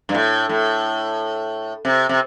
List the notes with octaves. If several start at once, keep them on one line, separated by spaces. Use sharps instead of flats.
G2
A2
A2
C3
C3